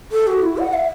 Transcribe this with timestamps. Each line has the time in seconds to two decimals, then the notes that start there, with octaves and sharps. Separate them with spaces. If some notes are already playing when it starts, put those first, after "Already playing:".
0.12 A4
0.27 F#4
0.42 E4
0.58 F#5
0.74 E5